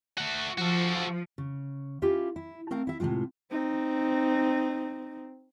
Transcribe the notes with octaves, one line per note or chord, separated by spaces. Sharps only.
A3 F#4
F3 F#4 A4
C#3
C#4 E4 F4 G4 F5
E4
A3 C4 A#4 F5
E4 E5
A2 C3 F3 G#3 F4
C4 D#4